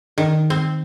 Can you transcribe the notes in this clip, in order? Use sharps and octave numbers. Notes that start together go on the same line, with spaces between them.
D#3
C4